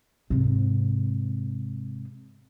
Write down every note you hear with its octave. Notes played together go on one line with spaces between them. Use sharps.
G#2 C3